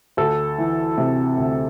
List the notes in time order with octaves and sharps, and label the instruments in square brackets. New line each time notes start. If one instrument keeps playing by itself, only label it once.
[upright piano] D2 A4
E3
C3
D2